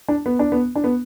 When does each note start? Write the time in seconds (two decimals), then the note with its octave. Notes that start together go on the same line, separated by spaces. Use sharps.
0.08 D4
0.26 B3
0.39 D4
0.52 B3
0.76 D4
0.84 B3